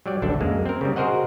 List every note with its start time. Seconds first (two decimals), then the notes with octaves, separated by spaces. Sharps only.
0.06 F#3 G3 D5
0.22 A1 D2 D4 A4
0.41 F#2 G#3 A#3
0.65 C4 A#4
0.81 C#3 G3
0.96 F#4 G#4 A#4 C5 D#5 F#5